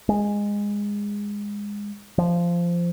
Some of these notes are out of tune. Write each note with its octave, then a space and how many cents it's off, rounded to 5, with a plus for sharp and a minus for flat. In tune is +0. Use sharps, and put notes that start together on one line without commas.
G#3 -15
F3 -15